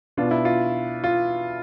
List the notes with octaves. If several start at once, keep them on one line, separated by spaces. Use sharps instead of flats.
B2 B3 D4 F4
E4
F4
F4